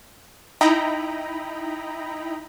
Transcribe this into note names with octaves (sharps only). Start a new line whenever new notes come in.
D#4 E4 D#5 G5 A#5 B5